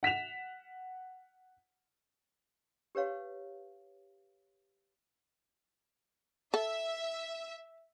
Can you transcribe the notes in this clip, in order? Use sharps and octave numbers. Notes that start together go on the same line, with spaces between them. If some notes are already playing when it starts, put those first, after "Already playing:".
F#5 B6 E7 F7
G4 B4 C#5 F5
A4 E5